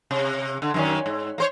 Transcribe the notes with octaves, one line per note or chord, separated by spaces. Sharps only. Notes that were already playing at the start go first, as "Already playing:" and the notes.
C3
D3
F#2 D#3 C#4
G#2
A#3 C5 C#5